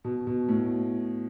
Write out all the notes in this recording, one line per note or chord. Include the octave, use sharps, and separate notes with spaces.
B2
B2
A2